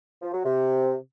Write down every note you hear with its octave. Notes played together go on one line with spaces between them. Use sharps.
F3
F#3
C3